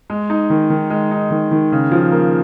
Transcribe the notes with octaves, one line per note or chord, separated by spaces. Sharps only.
G#3
D#4
D#3
D#3
G#3
D#4
D#3
D#3
C#3
F3
A#3